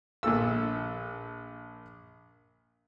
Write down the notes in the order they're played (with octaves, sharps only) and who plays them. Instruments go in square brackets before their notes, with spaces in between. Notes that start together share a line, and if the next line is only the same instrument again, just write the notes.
[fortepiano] A#1 A#2 A4 E6